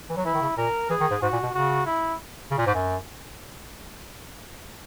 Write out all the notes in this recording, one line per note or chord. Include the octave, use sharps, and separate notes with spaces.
E3
F#3
E3 E4
D#3
C#3
A#2 A#4
E3 G#4
D#3
G#2
G#2 F#4
A#2
B2
C#3 F#4
E4
C#3
A#2
G#2
F#2